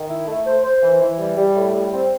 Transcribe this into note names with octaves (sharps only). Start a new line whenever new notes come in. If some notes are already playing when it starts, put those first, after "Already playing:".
Already playing: D#3
E4
A3
C5
C5
E3
E3
G3
G3
A2
G3
C4